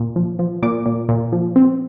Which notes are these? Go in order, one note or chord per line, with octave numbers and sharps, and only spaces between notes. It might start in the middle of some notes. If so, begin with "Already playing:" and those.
Already playing: A#2
F3
F3
A#2 D6
A#2
A#2
F3
C4